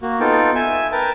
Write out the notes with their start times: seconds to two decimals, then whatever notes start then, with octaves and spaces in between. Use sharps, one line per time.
0.02 A#3 F#4
0.20 B3 D#4 F4 A4 G5
0.55 E5 G#5
0.92 A#4 B4 G5 A5